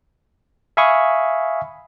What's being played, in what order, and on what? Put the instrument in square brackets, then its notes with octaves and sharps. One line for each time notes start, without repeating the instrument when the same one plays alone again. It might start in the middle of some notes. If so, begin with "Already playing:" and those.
[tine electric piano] E5 F5 G#5 B5 C#6 D#6